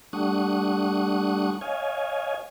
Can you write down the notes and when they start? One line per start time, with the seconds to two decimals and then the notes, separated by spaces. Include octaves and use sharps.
0.13 G3 A3 D4 F#5 C#6 D#6
1.61 C#5 D#5 F5 G#5